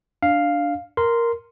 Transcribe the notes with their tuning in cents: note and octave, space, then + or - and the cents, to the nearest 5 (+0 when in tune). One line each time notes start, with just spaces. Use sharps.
D4 +0 F5 +0
A#4 +0 C6 -10